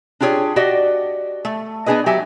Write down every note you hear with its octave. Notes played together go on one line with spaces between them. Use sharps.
D4 F4 G4 G#4 C#5
F#4 G4 D5 D#5 F#5
A3
B3 D4 G#4 B4 D#5
F#3 G4 E5 G#5